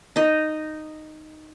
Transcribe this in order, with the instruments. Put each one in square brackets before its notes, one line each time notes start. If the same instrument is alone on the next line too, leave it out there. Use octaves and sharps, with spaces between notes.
[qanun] D#4 D#5